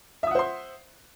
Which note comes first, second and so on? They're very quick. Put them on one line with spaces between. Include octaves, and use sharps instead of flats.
E5 D#6 F#5 C5 C6